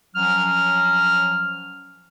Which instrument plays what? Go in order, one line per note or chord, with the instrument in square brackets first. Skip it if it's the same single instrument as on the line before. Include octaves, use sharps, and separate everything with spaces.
[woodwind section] F3 F#3 C#4 F6